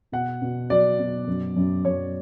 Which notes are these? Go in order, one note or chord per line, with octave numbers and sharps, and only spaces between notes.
B2 F#5
B2
F#3 D5
B2
F#2
F#2
F#2 C#5